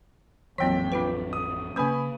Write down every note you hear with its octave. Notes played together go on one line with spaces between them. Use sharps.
A1 F2 A#2 E3 F#3 C4 G5 B6
D4 F4 B4
D#6
C#3 A#3 C#4 B4 G#5 B5 D#6